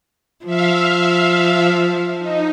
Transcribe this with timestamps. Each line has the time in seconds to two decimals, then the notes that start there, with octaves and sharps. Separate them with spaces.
0.46 F3 E5 F5
2.18 D#4